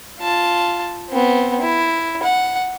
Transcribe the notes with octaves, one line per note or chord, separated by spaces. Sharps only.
F4 A5
B3 C4
E4
F#5